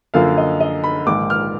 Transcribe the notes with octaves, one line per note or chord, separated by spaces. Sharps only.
F#2 D3 F3 A#3 F5
D#5
D#5
B5
A#1 G#2 D#3 D6
F6